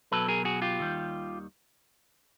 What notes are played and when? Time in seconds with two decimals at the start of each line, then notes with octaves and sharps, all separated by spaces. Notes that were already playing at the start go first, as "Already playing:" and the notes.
0.11 B1 B2 F#3 A4 B4
0.28 G#4 A#4
0.45 F#4 G#4
0.62 F4 G4
0.79 D#2 D#3 G3